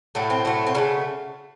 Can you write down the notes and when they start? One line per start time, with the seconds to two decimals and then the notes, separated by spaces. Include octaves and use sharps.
0.15 A2 F#3 A3
0.30 C4
0.45 A2 F#3 A3
0.67 C4
0.74 C#3 F#3 A3 C#4